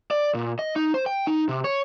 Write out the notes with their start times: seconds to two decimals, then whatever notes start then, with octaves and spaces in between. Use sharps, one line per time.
0.11 D5
0.34 A#2
0.59 D#5
0.76 D#4
0.94 C5
1.06 G5
1.27 D#4
1.49 C3
1.64 C#5